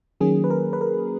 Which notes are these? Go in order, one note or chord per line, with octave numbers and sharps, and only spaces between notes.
D#3 F#3 A#3 C#4 G#4
B4
A#4
B4
A#4